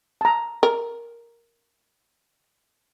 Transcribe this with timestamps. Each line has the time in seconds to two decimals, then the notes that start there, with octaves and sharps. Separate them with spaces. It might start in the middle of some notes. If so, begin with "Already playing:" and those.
0.21 A5 A#5
0.63 A#4